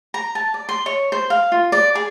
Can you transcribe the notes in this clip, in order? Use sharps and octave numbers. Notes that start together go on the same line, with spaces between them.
A#5
A5
D5
C6
C#5
C5
F5
F4
D5
G#4